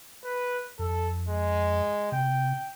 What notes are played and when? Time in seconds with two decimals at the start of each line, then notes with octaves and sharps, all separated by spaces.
0.24 B4
0.79 F2 A4
1.29 G#3
2.12 C3 G5